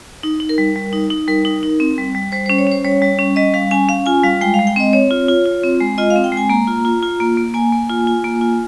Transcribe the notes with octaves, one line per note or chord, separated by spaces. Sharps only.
D#4
D#4
A#4
G3
G3
D#4
D#4
G3 A#4
D#4
D#4
C4
G3
G3
G3 C5
C#4 C5
C#5
C#4 C5
G3 C#5
G3
C#4
G3 D#5
G3 F5
C#4 G#5
C#4 F5
F4 G#5
G3 F5
G#3 G5
F5
G#3
G5
C4 D#5
C4 C#5
F4
F4
F4
C4
G#3
F4 D#5
F5
C4
G5
G#3
G#5
A#3 A#5
F4
F4
F4
A#3
A#3
A#3 G#5
A#3
F4
F4
A#3
F4